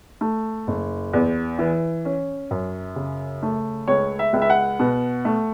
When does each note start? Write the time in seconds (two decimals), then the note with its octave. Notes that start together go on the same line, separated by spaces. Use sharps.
0.21 A3
0.67 F#1
1.13 E2
1.58 E3
2.05 C#4
2.51 F#2
2.96 C#3
3.42 A3
3.88 C#2 C#5
4.19 E5
4.33 C#2
4.42 E5
4.50 F#5
4.79 B2
5.25 A3